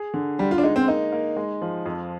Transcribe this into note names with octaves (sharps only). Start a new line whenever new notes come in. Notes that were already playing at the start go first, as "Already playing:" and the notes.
Already playing: G#4
D3
D3 G3
F4
D4
G#3 D#4
C4
A#3 D#4
A#3
G#3
F3
F2